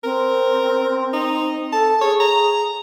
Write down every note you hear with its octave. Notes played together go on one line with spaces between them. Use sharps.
C4 A#4
D#4
A4 A5
G#4 C#5
A#5